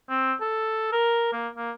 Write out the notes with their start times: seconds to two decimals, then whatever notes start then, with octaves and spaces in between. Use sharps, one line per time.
0.09 C4
0.41 A4
0.92 A#4
1.33 A#3
1.56 A#3